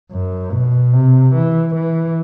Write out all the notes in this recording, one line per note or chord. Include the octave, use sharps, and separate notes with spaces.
F#2
B2
C3
E3
E3